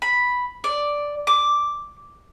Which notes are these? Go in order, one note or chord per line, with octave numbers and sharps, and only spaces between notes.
B5
D5
D6